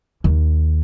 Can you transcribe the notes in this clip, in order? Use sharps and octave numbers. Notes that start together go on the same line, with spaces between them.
D#2